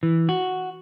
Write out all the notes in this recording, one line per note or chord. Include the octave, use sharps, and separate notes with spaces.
E3
F#4